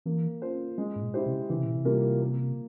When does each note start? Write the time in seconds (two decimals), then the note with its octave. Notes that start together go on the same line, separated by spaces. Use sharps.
0.06 E3 A#3
0.42 F4 C5
0.78 G#3
0.96 G#2
1.02 A#2
1.14 E4 G4 C5
1.26 C3
1.49 C#3 E3
1.57 C3
1.64 A#2
1.73 C3
1.85 G3 A#3 F4 A#4
2.22 A#3